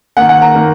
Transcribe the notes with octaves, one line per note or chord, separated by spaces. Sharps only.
D#3 A#3 F#5
F#5
A#5
D#3 A#3